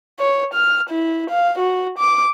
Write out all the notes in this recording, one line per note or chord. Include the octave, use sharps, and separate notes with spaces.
C#5
F6
E4
F5
F#4
D6